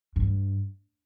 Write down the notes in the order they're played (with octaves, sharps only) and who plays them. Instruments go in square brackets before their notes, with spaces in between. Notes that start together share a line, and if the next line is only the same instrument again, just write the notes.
[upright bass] G2